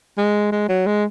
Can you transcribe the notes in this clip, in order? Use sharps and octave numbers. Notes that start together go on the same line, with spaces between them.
G#3
G#3
F#3
G#3